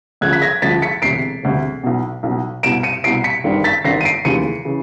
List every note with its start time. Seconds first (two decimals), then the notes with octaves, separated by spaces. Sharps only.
0.21 D2 C#3 F3 F#6 G#6
0.33 B6
0.42 G#6 A#6
0.62 D2 C#3 F3 A6 B6
0.82 B6 C#7
1.02 E1 D2 C3 C7 D7
1.43 E1 D2 C3
1.83 B1 B2
2.23 B1 B2
2.63 C2 B2 D7 E7
2.83 C#7 D#7
3.04 C2 C7 D7
3.07 B2
3.24 B6 C#7
3.44 G#1 G2 D#3
3.64 A6 B6
3.84 G#1 G2 D#3 A#6 C7
4.01 D#7
4.05 C7 D7
4.25 F1 D#2 C#3 E3 C#7 D#7
4.65 C#3 E3